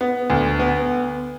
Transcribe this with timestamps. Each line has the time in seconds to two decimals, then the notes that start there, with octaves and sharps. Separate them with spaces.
0.01 B3
0.30 D2
0.60 B3